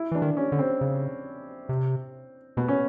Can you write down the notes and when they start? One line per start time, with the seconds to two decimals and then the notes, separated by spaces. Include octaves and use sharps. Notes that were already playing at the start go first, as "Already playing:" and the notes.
Already playing: E4
0.12 E3 D4
0.22 D#3
0.37 C#4
0.52 D3
0.59 C4
0.81 C#3
1.69 C3
2.57 B2 B3
2.68 C#4